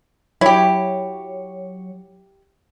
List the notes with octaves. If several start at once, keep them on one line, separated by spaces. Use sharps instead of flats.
F#3 E4 G4 C#5